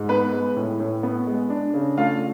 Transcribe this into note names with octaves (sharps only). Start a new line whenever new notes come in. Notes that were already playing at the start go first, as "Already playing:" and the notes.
Already playing: G#2
B3 B4 B5
G#3
A2
A2
B3
G#3
D4
C#3
A3 F4 F5